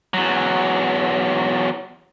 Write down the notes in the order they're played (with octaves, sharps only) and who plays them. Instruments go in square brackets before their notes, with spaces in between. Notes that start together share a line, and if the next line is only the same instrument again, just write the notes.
[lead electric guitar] E2 F#3